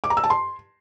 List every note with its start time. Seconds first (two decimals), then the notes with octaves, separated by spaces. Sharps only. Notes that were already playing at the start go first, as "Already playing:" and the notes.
0.04 D6
0.10 A#5
0.17 E6
0.24 A5
0.30 C6